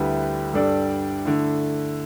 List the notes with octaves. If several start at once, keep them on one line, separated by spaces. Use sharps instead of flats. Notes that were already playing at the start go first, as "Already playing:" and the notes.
Already playing: D2 D3 G3 E4 B4
G2 G3 D4 A4 D5
D3 A3 E4